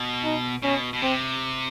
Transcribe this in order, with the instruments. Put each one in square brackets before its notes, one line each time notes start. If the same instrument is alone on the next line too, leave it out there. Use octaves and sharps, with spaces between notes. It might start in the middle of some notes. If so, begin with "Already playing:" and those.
Already playing: [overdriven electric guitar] B2
[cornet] D#4
[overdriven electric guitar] B2 [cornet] C#4
[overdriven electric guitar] B2
[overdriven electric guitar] C3 [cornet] C4